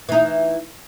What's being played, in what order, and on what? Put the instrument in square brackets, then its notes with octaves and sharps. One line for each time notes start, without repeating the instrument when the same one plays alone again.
[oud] E3 D#4